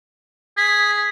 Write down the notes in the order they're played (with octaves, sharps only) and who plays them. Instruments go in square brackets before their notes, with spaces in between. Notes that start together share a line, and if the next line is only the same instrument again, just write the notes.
[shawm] G#4 [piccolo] B6